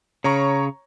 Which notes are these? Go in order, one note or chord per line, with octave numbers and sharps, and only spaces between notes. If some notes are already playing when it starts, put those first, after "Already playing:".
C#3 C#5 A#5 C#6